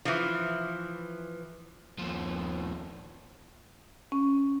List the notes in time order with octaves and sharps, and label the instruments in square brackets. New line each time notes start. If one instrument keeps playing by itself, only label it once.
[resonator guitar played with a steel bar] E3 F3
[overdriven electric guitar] D#2 F3
[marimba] C#4